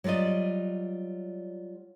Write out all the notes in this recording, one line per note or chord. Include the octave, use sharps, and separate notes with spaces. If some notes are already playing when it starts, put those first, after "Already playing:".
F#3 G3 F4 D5 D#5